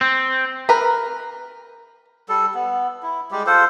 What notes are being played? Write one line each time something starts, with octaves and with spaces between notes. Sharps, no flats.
C4
A#4 B4
G3 A4
B3
E4
G3 G#3 G4
F4 A4 C5